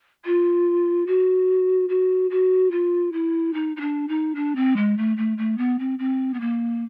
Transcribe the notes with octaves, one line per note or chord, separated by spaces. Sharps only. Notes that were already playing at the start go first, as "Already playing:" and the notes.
F4
F#4
F#4
F#4
F4
E4
D#4
D#4
D4
D#4
D4
C4
G#3
A3
A3
A3
B3
C4
C4
B3
A#3